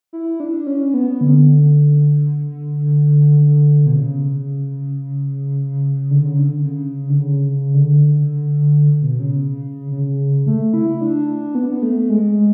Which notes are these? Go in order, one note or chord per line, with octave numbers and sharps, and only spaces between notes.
E4
D4
C#4
B3
D3
D3
B2
C#3
D3
C#3
D3
C#3
D3
C#3
D3
B2
C#3
C#3
A3
E4
D4
B3
A3
G#3